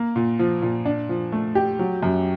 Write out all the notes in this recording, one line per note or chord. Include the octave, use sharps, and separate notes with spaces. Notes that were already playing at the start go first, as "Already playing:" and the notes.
Already playing: A#3
A#2
F3
A#2
D4
F3
A3
G4
F#3
F#2